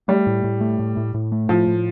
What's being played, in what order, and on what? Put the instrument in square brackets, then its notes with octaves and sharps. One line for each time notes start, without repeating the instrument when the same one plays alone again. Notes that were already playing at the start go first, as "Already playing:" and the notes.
[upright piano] G3 [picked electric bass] A3
[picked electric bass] A2
A2
A3
A2
A2
A2
A3
[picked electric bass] A2 [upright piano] F3
[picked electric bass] A2